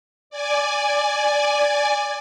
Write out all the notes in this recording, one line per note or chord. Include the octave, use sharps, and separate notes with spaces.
D5 G#5